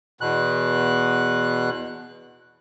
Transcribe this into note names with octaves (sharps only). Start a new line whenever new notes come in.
E2 B2 F#6